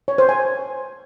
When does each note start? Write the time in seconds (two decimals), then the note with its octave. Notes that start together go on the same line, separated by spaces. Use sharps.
0.08 C#5
0.18 C5
0.29 G#5